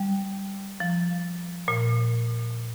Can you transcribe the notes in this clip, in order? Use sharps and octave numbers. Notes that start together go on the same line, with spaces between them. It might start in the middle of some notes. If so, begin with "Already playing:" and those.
Already playing: G3
F3
A#2